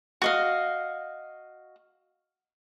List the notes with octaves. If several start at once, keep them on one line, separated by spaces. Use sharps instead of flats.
F#4 D#5 F5